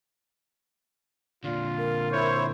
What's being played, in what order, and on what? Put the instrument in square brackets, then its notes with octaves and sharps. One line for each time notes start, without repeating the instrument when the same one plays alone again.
[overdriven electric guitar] A#2 D3 [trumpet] F4 [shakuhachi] D5
[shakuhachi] A#4
[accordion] E4 C5 [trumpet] C#5